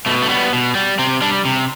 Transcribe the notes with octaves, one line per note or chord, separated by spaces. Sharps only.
B2 A3
A3
G3 B3
B2
G3
C3 C4
G3 D4
C3